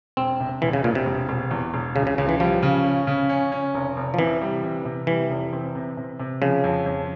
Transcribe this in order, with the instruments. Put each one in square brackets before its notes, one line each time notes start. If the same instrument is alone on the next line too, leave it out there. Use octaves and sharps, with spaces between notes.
[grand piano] E1 [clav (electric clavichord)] C4
[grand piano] C3
[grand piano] E1 [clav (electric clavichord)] E3
[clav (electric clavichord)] C#3
[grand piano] E1 [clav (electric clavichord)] A#2
[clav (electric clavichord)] C3
[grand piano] E1
E1
E2
E1
[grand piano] C#2 [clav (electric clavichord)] C#3
[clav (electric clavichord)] C#3
[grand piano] C#2 [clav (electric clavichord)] C#3
[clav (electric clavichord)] E3
[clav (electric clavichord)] F3 [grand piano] G3
[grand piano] C#3
C#4
C#3
C#4
C#4
F1
F1
[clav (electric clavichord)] F3
[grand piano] C3 [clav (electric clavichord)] E3
[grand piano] G3
C3
C3
[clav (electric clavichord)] E3 [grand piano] G3
[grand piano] F1
C4
C3
C3
C3
[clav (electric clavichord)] C#3 [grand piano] F3
[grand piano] F2
F2